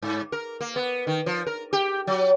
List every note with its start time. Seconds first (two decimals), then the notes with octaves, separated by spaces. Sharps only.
0.02 G#2
0.32 A#4
0.60 A#3
0.76 B3
1.07 D#3
1.26 F3
1.47 A#4
1.73 G4
2.07 F#3